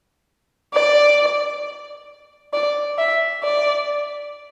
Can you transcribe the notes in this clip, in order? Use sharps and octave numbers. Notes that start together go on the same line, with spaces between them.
D5
D5
E5
D5